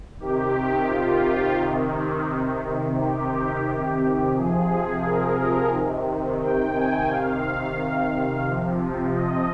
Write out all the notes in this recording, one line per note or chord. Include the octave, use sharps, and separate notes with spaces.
C3 D#3 G4
F4
C3 D#3
C3 D#3 G4
C3 F3 G#4
A#4
C3 D#3
G5
G#5
C3 D#3 F5
C3 F3
D#5